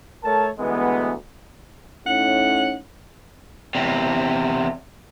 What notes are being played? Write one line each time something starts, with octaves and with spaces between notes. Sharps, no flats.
A3 A4 A#4 C#5 A5
D2 E3 G#3 B3
A2 C#4 D#4 F#5
E2 C3